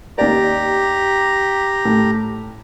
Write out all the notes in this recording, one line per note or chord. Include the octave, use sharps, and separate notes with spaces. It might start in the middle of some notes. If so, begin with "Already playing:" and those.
D#2 G4 D5 A#5
A2